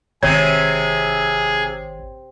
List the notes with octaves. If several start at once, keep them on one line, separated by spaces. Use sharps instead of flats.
G#1 C3 G#4 C#5 G#6